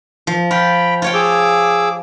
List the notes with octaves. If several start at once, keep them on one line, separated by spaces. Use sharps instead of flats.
F3
F4 G5 B5
F4 C#5 G5
G#4 D6 E6